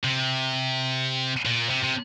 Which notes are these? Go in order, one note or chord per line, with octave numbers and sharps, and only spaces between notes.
C3
A#2
C3
C3